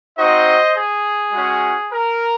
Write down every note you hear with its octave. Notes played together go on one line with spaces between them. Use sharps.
C4 D#4 F#4 C5 D#5
G#4
G#3 C#4 F#4
A#4